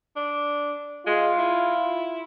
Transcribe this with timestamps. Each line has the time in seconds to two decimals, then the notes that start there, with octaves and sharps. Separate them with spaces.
0.16 D4
1.06 G#3 F4
1.38 E4